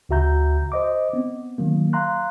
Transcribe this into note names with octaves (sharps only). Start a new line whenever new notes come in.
D2 C#3 F#4 E5 A#5 G6
C5 D#5 D6
B3 C4
D#3 F#3 A#3
F5 A#5 C6 F#6